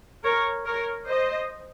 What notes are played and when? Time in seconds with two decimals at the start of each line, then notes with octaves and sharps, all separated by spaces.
0.24 A#4 C#5
0.66 A#4 C#5
1.08 C5 D#5